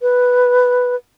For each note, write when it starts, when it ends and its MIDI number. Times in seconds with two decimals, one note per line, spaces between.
0.02 0.95 71